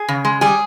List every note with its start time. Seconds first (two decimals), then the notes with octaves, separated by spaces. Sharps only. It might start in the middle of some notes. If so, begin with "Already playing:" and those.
Already playing: G#4
0.08 C#3
0.25 G#3
0.41 G3 G#4